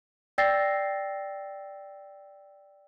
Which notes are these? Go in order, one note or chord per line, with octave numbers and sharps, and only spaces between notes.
D5 G5 E6 A6 A#6 C7